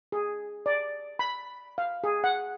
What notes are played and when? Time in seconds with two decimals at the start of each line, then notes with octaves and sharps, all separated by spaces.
0.12 G#4
0.66 D5
1.19 B5
1.78 F5
2.04 G#4
2.24 F#5